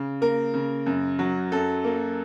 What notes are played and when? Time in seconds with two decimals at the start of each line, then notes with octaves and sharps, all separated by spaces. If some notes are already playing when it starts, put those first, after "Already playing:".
Already playing: C#3
0.21 A#3 A#4
0.54 C#3
0.86 F#2
1.19 F#3
1.52 F#2 A4
1.84 A#3